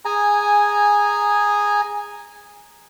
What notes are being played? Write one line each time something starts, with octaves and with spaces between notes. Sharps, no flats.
G#4 G#5 A#5